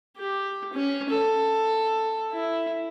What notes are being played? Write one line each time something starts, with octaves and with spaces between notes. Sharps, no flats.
G4
C#4
A4
E4